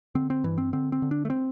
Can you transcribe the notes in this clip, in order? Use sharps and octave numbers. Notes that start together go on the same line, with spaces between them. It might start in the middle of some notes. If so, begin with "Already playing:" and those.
D3 C4
C4
G2 E3
C4
D3 C4
C4
D3
D4
A3
C4